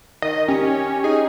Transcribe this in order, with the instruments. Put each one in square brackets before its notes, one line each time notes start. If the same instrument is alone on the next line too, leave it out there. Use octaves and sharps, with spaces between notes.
[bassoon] D#3 [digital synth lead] D#5
[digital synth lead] C#4 [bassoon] G4
[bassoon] D#4 [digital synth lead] G#4